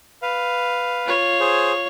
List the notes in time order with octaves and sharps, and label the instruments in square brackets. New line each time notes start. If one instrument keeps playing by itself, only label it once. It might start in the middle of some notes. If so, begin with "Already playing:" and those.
[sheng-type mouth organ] B4 F5
[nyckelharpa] F4 C#5
[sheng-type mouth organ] G#4 C5